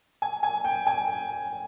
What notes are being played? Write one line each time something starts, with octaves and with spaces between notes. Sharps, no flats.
G#5
G#5
G5
G#5